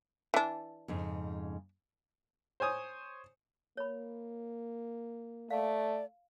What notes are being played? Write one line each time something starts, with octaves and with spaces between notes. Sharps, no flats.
E3 D4
F2 G#2 C#3
C5 C#5 G#5 D#6
A#3 C#5 B5
A3 D5 F5